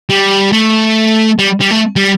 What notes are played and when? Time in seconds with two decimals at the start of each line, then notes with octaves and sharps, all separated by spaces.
0.09 G3
0.52 A3
1.39 G3
1.60 G3
1.70 A3
1.96 G3